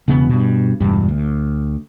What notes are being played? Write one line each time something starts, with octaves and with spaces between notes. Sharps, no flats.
E1 C#3 B3
G2 B2
E1 G2
D2